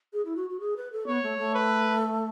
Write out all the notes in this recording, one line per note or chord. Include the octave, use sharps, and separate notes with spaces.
G#4
E4
F#4
F#4
G#4
B4
A4
B3 C#5
A3
A3
B4